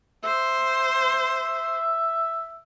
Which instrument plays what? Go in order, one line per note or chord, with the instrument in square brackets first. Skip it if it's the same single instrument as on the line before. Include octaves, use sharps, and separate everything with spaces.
[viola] C5 [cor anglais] E5